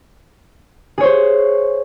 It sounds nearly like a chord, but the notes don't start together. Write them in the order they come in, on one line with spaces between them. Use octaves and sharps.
G#4 C#5 C5